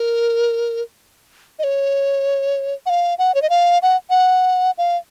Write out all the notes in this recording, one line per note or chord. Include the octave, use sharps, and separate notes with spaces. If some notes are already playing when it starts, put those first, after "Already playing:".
Already playing: A#4
D#5
C#5
F#5
F5
F#5
C#5
D#5
F5
F#5
F#5
F5